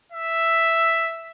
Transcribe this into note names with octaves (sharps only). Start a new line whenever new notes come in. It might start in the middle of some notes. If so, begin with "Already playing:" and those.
E5